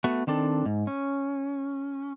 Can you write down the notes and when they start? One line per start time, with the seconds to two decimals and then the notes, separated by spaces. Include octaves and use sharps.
0.04 A3 B3 F#4
0.27 D#3 C4 D4 A4
0.66 G#2
0.87 C#4